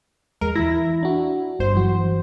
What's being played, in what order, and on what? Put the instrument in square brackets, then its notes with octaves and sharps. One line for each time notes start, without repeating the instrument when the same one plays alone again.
[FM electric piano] E2 G#3 [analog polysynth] A#4
[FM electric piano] E3 A#5 A#6 [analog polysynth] E4
[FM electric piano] D4 F#4
[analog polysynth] G1 C5
[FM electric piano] E3 F#3 F#4